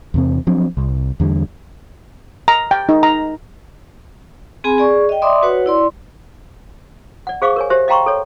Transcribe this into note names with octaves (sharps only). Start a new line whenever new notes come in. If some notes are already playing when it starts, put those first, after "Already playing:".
E2 C3 C4
F3 F#3 C4 D4
C2
E2 D3 G3
A#5
G5
D#4
A#5
C4 G#4 G#5 B5
G#4 D5 C#6
D#5 G5
D5 E5 B5 C6 D6 D#6
F#4 B4 C#5 F#5
E4 D5 C6
D5 F#5
G#4 C5 F5 C#6 D6
A#4 C#5 G#5
G4 C5 E5
D#5 F5 G5 A#5 C6 C#6
A4 C#5